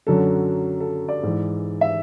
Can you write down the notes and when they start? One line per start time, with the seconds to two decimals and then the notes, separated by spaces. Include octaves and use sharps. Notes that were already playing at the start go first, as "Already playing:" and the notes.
0.07 F#2 D3 F#3 A4
0.80 A4
1.09 D5
1.23 G#2 E3
1.81 E5